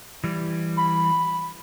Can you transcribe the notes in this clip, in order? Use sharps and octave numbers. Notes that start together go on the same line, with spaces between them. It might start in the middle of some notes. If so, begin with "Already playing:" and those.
E3 G3
B5